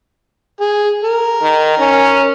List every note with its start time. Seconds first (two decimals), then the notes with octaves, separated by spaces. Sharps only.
0.60 G#4
1.04 A#4
1.42 D#3
1.79 C#4